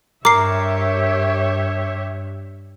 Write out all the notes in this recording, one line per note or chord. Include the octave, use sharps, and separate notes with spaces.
G2 G4 A#4 C#5 E5 D6 C7